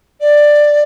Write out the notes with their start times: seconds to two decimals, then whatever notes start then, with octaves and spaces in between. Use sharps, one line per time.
0.20 D5